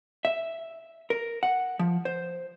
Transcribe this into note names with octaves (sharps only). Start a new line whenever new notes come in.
E5
A#4
F#5
F3
C5